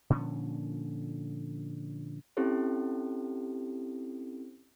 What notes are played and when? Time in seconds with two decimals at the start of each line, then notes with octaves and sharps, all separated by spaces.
0.10 A#2 D3 F3 C#4
2.37 C4 C#4 E4 G4 A4 C5